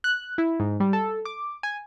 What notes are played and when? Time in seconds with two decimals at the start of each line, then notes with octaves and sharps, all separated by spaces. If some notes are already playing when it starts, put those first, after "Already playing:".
0.04 F#6
0.38 E4
0.60 G#2
0.80 G3
0.93 A4
1.25 D6
1.63 G#5